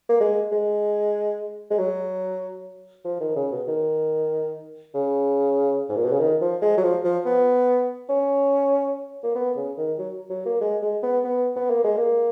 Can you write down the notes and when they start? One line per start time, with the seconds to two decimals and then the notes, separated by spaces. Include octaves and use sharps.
0.09 A#3
0.20 G#3
0.52 G#3
1.70 G#3
1.79 F#3
3.04 F3
3.20 D#3
3.36 C#3
3.52 B2
3.68 D#3
4.94 C#3
5.89 G#2
5.97 A#2
6.05 B2
6.12 C#3
6.20 D#3
6.41 F3
6.62 G#3
6.77 F#3
6.83 F3
7.04 F3
7.25 B3
8.09 C#4
9.23 A#3
9.35 B3
9.56 C#3
9.77 D#3
9.98 F#3
10.30 F#3
10.46 A#3
10.61 G#3
10.82 G#3
11.03 B3
11.24 B3
11.56 B3
11.70 A#3
11.84 G#3
11.97 A#3